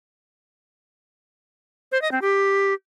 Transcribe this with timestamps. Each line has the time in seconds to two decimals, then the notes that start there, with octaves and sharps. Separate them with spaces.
1.92 C5
2.02 D#5
2.12 C4
2.21 G4